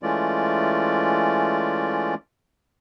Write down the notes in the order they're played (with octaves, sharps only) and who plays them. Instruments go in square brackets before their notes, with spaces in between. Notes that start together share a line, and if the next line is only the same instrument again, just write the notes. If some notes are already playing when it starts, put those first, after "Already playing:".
[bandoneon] E3 G#3 A3 C#4 F4 D5